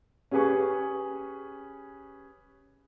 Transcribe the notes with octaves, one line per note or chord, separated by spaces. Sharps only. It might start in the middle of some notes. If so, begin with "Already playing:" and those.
C#4 G4 G#4 B4 G#5 C#6